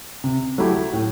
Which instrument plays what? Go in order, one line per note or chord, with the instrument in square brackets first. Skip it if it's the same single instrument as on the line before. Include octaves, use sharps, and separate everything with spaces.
[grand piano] C3
F#3 A3 E4 G4
A2